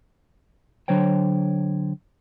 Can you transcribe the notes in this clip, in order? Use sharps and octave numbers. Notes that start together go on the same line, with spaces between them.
D3 F#3 C5 C#5 G5